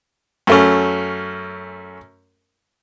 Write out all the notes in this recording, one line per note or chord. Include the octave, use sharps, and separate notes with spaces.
F#2 A3 C#4